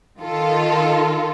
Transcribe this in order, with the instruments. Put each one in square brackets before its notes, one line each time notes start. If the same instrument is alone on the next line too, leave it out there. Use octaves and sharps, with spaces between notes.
[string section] D#3 F4 A4